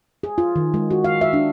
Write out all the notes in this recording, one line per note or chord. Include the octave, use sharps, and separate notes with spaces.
G#4
F4
D#3
G#3
F#4
F5
E5
D4